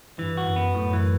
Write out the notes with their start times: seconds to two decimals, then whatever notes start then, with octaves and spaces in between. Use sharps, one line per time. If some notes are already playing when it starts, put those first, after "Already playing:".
0.18 G2 E3
0.37 F#4
0.46 F#2
0.56 B3
0.74 F#2 A2
0.93 E3